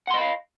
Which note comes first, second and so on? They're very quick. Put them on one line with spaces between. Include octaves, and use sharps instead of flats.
F#5 C6 D#5 B5 F5